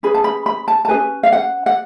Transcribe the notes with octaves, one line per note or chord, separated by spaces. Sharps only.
C#4 G#4 B4 B5
A5
B5
B5
A5
A5
G#4 B4 G#5
C#4
F5
F#5
F#5